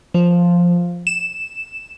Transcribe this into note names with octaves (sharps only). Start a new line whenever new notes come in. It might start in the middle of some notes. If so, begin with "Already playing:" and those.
F3
E7